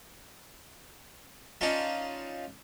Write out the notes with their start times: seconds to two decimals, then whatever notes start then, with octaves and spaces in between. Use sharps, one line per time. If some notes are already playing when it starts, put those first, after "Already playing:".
1.61 C#4 D#4 F4 D5 A5 C#6